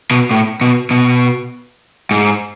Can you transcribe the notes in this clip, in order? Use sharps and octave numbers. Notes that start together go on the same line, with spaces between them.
B2
A2
B2
B2
G#2